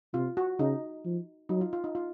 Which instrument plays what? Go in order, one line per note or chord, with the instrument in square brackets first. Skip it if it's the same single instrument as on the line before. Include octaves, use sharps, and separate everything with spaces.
[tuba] C3 [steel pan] F4
[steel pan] F#4
[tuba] C#3 [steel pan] D#4
[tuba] F3
[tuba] F#3 [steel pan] D#4
[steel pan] F4
F4
D#4
F4